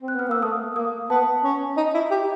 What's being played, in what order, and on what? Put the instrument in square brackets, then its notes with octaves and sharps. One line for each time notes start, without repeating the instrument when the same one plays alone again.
[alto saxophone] C4
[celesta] F#6
[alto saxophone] B3 [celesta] F6
[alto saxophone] A#3 [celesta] E6
[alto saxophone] A3 [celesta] D#6
[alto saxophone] A#3 [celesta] D#6
[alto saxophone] B3 [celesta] A5
[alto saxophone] C#4
D#4
E4
G4